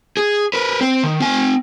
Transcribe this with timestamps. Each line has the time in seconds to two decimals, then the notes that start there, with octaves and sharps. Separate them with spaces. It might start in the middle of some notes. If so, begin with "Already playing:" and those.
0.17 G#4
0.54 A#4 B4
0.81 C4
1.04 D#3
1.20 C4 G#5